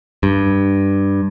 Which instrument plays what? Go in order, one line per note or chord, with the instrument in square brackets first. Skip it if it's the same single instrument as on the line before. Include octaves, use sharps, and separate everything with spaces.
[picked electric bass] G2